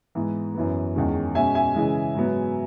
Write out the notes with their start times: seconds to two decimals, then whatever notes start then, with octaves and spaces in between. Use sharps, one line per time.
0.15 G#2 E3 B3
0.55 F#2 E3 B3
0.95 E2 D#3 G#3 C#4
1.35 B2 G#3 C#4 E5 G#5
1.55 E5 G#5
1.74 C#3 E3 G#3
2.15 G#2 F#3 B3